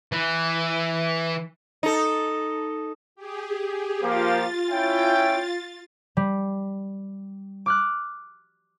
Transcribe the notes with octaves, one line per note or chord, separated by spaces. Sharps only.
E3
D#4 A4
G4 G#4
F3 A#3 F4 G4 A6
C#4 E4 G5
G3
D6 F6 F#6